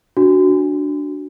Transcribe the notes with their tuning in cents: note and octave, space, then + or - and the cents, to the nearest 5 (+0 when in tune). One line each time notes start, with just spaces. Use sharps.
D4 +0 F#4 +0